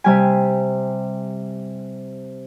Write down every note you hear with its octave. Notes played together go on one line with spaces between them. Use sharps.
C3 G3 G#5